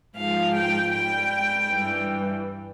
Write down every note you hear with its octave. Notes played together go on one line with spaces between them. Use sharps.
G#2 F3 F5
G5
G#2 G3 G5
G2 E3 G3